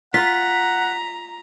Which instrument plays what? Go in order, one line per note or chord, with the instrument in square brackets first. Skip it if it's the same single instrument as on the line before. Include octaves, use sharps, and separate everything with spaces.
[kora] F4 [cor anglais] F#5 [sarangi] A#5 [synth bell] B6